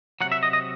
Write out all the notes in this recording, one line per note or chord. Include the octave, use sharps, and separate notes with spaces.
C3 D#3 F#3 F#5
E5
D#5
D#5